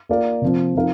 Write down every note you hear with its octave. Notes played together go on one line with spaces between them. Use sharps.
A#3 F4 A#4 D5 F5
C3 F3 C4
F3 C4 D#4 A#4 F5